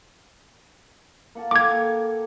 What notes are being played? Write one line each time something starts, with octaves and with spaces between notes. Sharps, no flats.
A#3 F#5 A5
A#3 A4 G5 D6 G#6